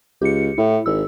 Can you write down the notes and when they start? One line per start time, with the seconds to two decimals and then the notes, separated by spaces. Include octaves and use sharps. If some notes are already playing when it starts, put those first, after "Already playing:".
0.22 C#2 G4 C#7
0.58 A2 E4
0.86 G#1 E6